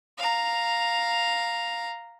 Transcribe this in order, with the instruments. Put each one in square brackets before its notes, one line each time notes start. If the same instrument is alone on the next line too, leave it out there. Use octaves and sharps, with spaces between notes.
[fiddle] F5 A#5